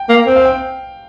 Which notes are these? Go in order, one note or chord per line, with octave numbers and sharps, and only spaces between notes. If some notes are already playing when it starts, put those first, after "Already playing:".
Already playing: G5
A#3
C4 G5
F5
G5